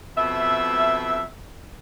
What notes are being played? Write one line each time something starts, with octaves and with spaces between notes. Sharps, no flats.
F2 B2 E5